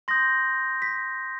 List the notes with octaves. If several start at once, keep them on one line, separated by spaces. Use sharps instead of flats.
C6 D#6 G6 A#6
B6